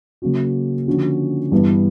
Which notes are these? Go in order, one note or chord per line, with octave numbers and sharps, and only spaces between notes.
C#3 F#3 A#3 C#4 F#4
D3 F3 A#3 C#4 F#4
G2 E3 G3 B3 D4